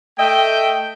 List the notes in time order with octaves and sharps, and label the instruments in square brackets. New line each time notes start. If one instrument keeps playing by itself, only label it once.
[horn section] A3 D#5 E5 G5